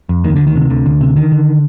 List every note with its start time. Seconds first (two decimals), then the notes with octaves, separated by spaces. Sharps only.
0.09 F2
0.24 D2 D#3
0.36 D2 D3
0.47 D#3
0.56 C3
0.70 D2 D3
0.86 D2
1.01 C3
1.16 D3 D#3
1.32 D3